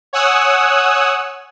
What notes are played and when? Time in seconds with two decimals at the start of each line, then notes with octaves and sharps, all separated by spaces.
0.13 C#5 F#5 G#5 D#6 E6 F#6